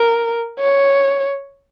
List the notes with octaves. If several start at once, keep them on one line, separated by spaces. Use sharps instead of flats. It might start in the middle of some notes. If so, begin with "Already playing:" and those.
Already playing: A#4
C#5